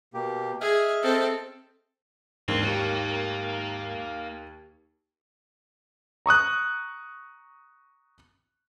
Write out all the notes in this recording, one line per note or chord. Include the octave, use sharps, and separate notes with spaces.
B2 A#3 G4
G#4 D#5 E5 F6
C4 A4
D#2 G#2 C4 D4 C5
A#3 G4 C#5
A#5 C#6 D#6 F#6